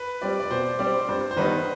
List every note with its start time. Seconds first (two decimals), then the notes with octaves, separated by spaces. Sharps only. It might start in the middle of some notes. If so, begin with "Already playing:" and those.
Already playing: B4
0.22 G3 C4 G4 D5
0.40 D5
0.50 B2 C5
0.79 G3 C4 G4 D5
1.08 G2 C5
1.31 C5
1.36 D#3 G3 B3 D#4 B4